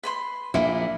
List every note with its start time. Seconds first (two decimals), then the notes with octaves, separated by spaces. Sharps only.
0.03 B4 B5 C6
0.54 A#1 A#2 E4